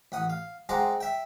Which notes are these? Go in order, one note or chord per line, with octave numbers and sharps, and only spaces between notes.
A1 F#5 D#6
F5
G#3 C4 G#4 F#5 A#5 D6
E5 G5